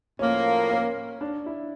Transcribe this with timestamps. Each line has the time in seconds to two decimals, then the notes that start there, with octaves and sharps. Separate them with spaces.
0.19 A2 F3 A#3 C#4
0.70 C#4
1.21 D4
1.46 E4